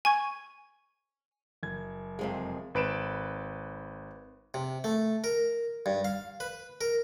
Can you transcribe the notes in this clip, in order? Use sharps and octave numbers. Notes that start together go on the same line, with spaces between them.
G#5 C#6 G#6
F#1 G#6
F2 C3 G#3
G#1 B4 D7 E7
C3
A3
A#4
G2
F5
B4
A#4